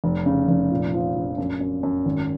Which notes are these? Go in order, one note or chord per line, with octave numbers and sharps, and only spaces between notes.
F1
C#3
F1
A#2
F3
A#1
F#2
F#2
F#2
G#1